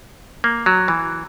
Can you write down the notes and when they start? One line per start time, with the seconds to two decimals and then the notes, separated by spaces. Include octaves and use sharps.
0.44 A#3
0.66 F#3
0.88 E3